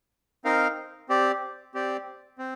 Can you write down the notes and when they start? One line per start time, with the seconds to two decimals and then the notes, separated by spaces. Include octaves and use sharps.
0.45 C4 D#4 A#4 F5
1.09 C4 G4 D5
1.75 C4 G4 D5
2.38 C4